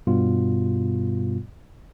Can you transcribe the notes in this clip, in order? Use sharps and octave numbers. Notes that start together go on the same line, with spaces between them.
G2 B2 G3 B3 F4